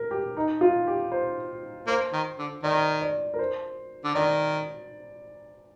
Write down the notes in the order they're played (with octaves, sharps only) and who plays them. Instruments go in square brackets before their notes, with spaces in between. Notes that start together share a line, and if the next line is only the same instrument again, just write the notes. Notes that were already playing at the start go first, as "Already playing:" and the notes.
Already playing: [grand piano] A#4
G4
D#4
F4
G4
C5
[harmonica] A#3 [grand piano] C5
[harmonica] D#3
D3
[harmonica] D#3 [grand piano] D5
[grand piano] D5
A#4
C5
[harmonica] D3
[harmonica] D#3 [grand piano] D5